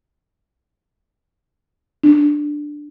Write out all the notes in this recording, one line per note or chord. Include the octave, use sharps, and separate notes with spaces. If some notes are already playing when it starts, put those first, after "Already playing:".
D4